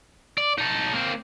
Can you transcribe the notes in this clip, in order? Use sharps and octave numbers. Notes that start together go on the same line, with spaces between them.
D5
D#4 A4
A#3 C4